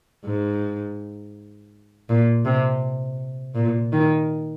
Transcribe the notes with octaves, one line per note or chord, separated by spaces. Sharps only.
G#2
A#2
C3
A#2
D#3